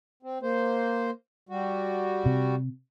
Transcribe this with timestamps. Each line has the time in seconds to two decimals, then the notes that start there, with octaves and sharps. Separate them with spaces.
0.23 C4
0.42 A#3 C5
1.49 G3 F#4
2.26 C3